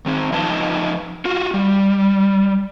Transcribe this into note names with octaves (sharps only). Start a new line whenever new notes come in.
D#3 C4
F3 D#4 B4 D#5 A5
F4 F#4
G3